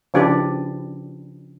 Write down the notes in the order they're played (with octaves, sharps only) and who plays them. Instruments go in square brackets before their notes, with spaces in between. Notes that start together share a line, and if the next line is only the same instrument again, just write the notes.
[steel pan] C#3 F3 D4 E4 G4 B4